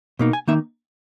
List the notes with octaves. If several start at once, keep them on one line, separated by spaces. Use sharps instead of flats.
B2 A#3 D#4
G#5
D#3 A#3 D#4 E5